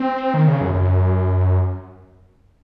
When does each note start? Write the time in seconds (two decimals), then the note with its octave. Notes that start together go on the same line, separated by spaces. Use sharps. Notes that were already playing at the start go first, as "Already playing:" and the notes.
Already playing: C4
0.34 D#3
0.48 C#3
0.61 F#2
0.74 F#2